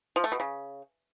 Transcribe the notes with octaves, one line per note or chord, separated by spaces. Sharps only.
F3
A3
B2
C#3